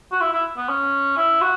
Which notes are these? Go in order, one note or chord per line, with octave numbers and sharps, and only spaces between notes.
F#4
E4
E4
B3
C#4
E4
F#4